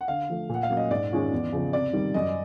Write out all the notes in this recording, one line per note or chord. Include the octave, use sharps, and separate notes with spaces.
F#5
D3 F5
F3 A3
A#2
F#5
F5
F#3 A#3 C#4
D#5
G#2 D5
D#3 G#3 C#4 F4
E2
C#3 F3
C3 D5
D#3 G3
F#2 D#5